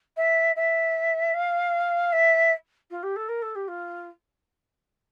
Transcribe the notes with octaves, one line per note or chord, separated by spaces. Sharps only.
E5
E5
F5
E5
F4
G4
A4
A#4
A4
G4
F4